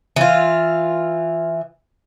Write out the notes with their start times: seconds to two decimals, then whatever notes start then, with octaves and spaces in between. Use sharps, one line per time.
0.16 E3 F4